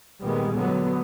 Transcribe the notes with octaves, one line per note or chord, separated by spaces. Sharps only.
A#2 D#3 G3 G#3 B3
D3 F#3 B3